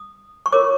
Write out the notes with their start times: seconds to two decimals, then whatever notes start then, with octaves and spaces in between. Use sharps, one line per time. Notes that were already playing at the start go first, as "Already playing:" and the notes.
Already playing: D#6
0.46 C#6
0.52 F4 A#4 C#5 D6